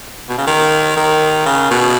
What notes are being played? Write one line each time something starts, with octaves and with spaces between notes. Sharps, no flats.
B2
C#3
D#3
D#3
C#3
B2